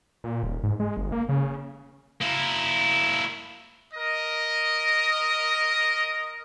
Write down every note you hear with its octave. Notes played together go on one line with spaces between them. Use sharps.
A#2
D#1
G#2
G#3
G1
A#3
C#3
A#3 E4
A#4 D#5